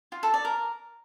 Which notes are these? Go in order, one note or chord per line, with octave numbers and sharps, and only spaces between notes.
F4
A4
D5
A#4